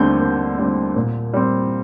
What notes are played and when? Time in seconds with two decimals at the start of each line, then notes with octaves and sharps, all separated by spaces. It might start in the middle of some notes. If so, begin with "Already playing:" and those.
Already playing: D#2 D3 G3 C4 G6
0.20 D#2
0.58 D3 G3 C4
0.96 A#2
1.34 G3 C4